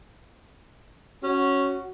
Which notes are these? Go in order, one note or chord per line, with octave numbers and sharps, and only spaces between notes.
C#4 F#4